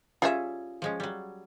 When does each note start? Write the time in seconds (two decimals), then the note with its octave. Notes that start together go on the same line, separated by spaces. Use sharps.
0.22 G3 C#4 F4 G#4 E5
0.82 F3 G#3 C#4
1.00 F#3 G3